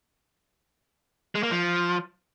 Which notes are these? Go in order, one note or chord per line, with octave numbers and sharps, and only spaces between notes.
G#3
A#3
F3